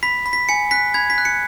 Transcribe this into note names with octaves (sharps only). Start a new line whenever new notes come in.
B5 B6
B5
B6
G#5 C#7
F#6 B6
B5 G#6
B6
F#6
C#7